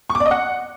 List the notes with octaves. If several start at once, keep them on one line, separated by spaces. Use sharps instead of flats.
C#6
D6
D5
D#5
F#5